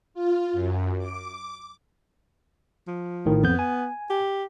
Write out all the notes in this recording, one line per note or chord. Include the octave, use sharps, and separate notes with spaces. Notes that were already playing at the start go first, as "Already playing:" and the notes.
F4
F#2
D6
F3
A#1 A2 D#3
F2 B3 G6
G#5
G4